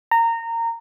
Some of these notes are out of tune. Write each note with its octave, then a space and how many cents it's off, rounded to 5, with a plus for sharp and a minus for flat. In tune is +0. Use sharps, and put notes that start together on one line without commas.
A#5 -20